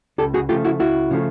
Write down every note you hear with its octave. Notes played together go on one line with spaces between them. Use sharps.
C#2 G4 A4
F#4 G#4
C#3 F3 A3 F4 G4
E4 F#4
C#2 E4 F#4
C#3 F3 A3